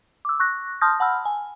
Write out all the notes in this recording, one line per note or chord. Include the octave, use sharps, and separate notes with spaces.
D6 E6
C#6 F#6 A#6
A5 C6 D#6 F6 G6 A#6
F#5 A5 B5 E6 F6
G#5